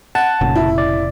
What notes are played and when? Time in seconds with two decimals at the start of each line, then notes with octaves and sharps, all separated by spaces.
0.15 F#5 A5
0.41 F1 A#2 C#3
0.56 E4
0.78 D5